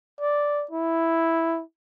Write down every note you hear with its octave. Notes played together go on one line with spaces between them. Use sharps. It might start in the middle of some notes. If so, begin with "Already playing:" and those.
D5
E4